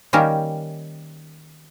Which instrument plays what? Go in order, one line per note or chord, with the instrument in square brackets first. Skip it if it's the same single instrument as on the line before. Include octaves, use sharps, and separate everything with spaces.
[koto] D#3 G3 A#3 C#4 G4 A#4